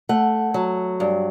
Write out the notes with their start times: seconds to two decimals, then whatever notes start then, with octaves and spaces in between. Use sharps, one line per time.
0.09 A3 F#5
0.54 F#3
1.00 G2